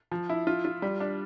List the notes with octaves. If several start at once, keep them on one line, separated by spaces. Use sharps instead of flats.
F3
E4
F4
F4
G3
D4